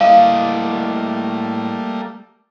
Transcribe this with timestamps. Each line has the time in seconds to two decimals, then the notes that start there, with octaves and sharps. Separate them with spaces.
0.01 A2 G3 A3 A#3 D#5 F5